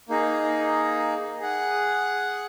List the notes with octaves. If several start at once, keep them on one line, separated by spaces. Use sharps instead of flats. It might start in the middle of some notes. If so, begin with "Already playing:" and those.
A#3 D#4 G#4
G#4 F#5